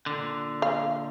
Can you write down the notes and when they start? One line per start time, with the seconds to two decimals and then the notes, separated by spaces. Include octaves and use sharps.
0.06 A#2 D3
0.62 F5